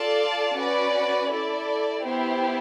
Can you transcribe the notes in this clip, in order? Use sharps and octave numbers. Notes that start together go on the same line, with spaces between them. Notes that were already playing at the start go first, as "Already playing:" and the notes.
Already playing: F4 A4 D5 F5 A5
C#4 F#4 B4 D5
E4 A4 D5
B3 E4 G4 C5